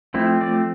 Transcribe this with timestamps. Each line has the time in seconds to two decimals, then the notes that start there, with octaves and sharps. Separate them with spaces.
0.14 F3 A3 C4 E4
0.41 D5